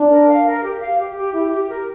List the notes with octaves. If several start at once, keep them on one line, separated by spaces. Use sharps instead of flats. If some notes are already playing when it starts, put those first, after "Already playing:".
Already playing: D4
A#4
F5
A#4
G4
F5
G4
G4
E4 G4
G4
A#4